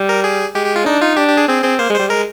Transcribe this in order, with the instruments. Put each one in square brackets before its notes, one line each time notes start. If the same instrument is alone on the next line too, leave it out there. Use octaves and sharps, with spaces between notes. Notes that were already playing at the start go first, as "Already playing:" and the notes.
Already playing: [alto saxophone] G3
[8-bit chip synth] A#4
G#4
[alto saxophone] G#3 [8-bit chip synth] G4
[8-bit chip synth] G4
F4
[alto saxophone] D4 [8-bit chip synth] D#4
[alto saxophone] D#4 [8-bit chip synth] F4
[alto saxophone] D4 [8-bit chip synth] G4
[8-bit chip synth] G4
G#4
[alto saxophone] C4 [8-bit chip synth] G#4
[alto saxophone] C4 [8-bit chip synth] G#4
[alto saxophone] A#3 [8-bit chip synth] C5
[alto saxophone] G#3 [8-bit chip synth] C5
[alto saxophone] G3
[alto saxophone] G#3 [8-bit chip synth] A#4